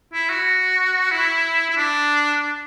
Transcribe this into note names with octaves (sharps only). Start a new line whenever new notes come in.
E4
F#4
E4
E4
D4